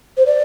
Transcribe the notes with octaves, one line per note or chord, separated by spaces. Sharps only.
C5
D5